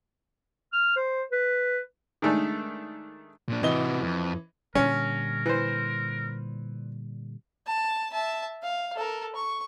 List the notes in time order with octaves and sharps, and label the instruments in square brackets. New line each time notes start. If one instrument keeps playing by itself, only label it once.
[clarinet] F6
C5
B4
[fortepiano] D#3 G#3 A3 D4 D#4
[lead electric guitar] A#2 D4
[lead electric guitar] C3 F#4 [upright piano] E3 D#5 G7
[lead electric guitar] F2
[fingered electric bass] A#2 D3 G3 [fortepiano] C#4 [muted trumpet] A#4
[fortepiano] E3 C5
[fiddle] A5
E5 A5
F5
A4 A#4
C#6